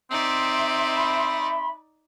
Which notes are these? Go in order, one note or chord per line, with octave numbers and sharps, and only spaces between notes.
C4 D#4 D5 E5 C6
B5